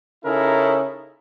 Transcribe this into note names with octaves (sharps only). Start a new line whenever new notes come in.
C#3 C#4 D#4 E4 A4 A#4